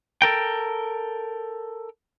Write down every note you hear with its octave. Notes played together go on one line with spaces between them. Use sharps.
A4 A#4 G5